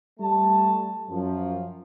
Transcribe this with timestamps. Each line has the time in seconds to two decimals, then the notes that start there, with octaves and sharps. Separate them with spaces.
0.20 G3 A3 A5
1.10 F#2 F3